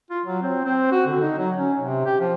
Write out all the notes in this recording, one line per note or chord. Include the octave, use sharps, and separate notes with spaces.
F4
F#3
C4
C4
F#4
D3
D#4
F#3
C#4
C3
G4
F3